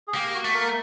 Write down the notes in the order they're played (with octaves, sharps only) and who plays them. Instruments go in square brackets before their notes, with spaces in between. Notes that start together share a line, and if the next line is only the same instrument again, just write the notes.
[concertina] G#4
[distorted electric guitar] A#3 [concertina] G4
[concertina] F#4
[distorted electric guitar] A3
[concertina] A#3 A#4